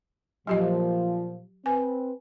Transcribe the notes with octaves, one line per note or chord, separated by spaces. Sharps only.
A#2 F3 F#3 G4 D#5
C4 B4 G#5